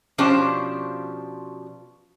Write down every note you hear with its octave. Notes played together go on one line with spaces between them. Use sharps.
B2 F3 C#4 D4 G4 C5